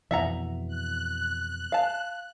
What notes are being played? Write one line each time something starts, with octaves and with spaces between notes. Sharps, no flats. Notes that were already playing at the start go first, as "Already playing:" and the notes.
F2 B2 E3 E5 F#5 A#5
F#6
F5 A5